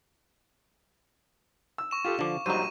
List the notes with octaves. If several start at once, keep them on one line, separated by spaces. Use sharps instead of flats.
E6
C#6 E7
F4 G4 A4
D3 F3 F5 D6
A#1 F#3 G3 D#4 C5 C#6 D#7